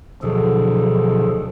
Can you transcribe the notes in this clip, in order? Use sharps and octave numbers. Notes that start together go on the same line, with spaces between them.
D2 B2 F3 F#3 G#4 A4